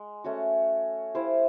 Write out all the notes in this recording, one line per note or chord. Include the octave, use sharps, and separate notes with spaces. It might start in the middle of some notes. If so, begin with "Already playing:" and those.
Already playing: G#3
A3 C#4 F#4
E4 G4 C5 F5